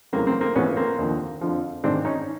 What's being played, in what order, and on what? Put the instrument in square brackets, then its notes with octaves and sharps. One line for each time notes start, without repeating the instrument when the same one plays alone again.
[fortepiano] E2 C#3 F#3 A#3 C4
A#3 C4
A#3 C4
A#1 G#2 E3 B3 C#4
A#3 C4
D#2 D3 F3
F2 D3 F3
G#1 G#2 D#3 C4 D4
C#4 D#4